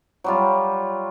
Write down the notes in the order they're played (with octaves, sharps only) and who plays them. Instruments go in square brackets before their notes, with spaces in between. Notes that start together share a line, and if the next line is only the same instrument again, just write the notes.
[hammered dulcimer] F#3 G3 F4